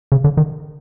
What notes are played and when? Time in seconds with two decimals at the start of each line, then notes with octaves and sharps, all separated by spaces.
0.12 C#3
0.24 D3
0.37 D#3